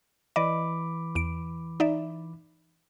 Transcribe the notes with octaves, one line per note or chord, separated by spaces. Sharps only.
E3 D5 D#5 B5 D6
E2 D7
D#4 D5 E5